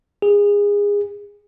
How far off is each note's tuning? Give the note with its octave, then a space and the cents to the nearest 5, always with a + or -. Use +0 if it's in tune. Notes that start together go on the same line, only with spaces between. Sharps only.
G#4 -25